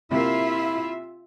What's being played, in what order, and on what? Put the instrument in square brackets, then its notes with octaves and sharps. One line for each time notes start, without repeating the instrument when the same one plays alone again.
[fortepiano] C3 A#3 [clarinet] E4 [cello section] F4 E5